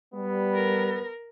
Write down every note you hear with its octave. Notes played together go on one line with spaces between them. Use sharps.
G3 B3
A#4